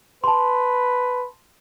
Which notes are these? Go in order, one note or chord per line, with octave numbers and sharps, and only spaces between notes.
B4 A5 C6